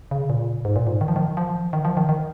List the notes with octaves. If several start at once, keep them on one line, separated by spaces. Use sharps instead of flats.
C#3
A#2
G#2
A#2
G#2
D#3
F3
D#3
F3
D#3
F3
D#3
D#3